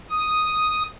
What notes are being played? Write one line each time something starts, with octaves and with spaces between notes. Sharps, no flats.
D#6